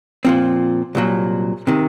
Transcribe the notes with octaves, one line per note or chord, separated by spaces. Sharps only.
A#2 F3 C4
C2 A#2 F#3
C3 D#3